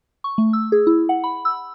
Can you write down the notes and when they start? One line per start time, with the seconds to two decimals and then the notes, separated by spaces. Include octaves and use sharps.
0.24 C#6
0.38 A3
0.53 E6
0.72 G#4
0.87 E4
1.09 F#5
1.24 B5
1.45 E6